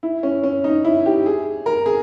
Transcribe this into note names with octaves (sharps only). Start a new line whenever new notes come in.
E4
C#4
C#4
D#4
E4
G4
G#4
A#4
G#4